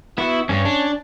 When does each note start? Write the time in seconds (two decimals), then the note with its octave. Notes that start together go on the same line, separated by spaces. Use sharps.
0.18 B3 E4 F#4 E5
0.49 G2 G3 C#4 C#5
0.65 D4